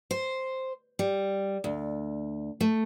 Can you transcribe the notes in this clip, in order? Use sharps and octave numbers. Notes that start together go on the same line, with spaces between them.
C5
G3
D2
A3